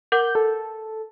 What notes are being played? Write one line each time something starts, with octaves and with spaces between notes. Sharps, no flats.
A#4 F#5 D6 G6
A4